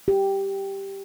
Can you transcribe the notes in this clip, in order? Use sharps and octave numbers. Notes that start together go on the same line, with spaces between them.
G4